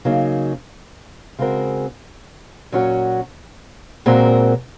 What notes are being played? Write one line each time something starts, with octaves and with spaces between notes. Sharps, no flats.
C#3 F#3 A#3 D#4
C#3 G#3 C4 F#4 A#4
A#2 F#3 C#4 F#4
A#2 G#3 C4 F#4 A#4